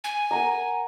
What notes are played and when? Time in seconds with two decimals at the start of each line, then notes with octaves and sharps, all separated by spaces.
0.04 G#5
0.31 A#4 F#5 A#5